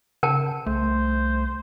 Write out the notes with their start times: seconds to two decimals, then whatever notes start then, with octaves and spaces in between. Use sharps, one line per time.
0.23 C#3 A#4 G5 A5
0.66 C2 A3 C5